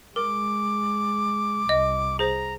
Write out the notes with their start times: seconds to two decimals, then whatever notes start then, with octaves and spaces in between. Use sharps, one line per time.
0.16 G#3 A#4 D6
1.69 C2 D#5
2.19 G#4 C5 A#5